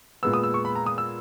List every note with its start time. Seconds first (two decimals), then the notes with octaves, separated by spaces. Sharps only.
0.23 A#2 G#3 B3 E6
0.34 D#6
0.43 E6
0.54 C#6
0.65 B5
0.75 A#5
0.86 D#6
0.98 E6